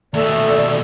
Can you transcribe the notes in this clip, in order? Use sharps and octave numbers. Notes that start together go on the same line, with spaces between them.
D#2 B2 A3 A4 D5